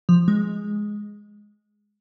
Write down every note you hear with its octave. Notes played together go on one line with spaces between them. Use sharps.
F3
G#3